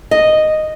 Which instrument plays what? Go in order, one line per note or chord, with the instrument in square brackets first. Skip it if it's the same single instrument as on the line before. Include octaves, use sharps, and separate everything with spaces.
[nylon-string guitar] D#5